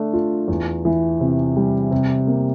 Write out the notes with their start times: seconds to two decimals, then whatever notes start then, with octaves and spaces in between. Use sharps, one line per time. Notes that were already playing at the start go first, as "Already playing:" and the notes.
Already playing: D3 A3 D4
0.13 F4
0.48 E2
0.85 E3
1.20 C3
1.56 G3
1.91 C3
2.27 A#3